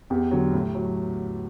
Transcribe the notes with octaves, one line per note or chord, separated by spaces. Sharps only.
E2 G4
D3 F#3
A2
F#3